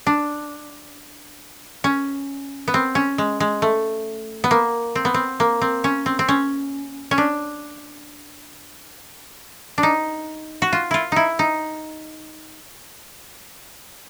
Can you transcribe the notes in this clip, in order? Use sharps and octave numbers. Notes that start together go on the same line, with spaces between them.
D4
C#4
B3
C4
C#4
G#3
G#3
A3
B3
A#3
C4
B3
C4
A#3
C4
C#4
C4
C4
C#4
C#4
D4
D4
D#4
F#4
F4
E4 F4
D#4 E4
D#4